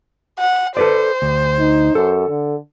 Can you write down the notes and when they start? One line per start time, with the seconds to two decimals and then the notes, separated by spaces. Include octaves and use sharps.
0.39 F#5
0.77 A4 B4 C5 D5
1.22 D2
1.59 D#4
1.95 F#2 A4
2.29 D3